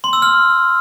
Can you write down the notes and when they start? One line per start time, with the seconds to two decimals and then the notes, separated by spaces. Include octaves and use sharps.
0.04 C6
0.13 E6
0.22 F6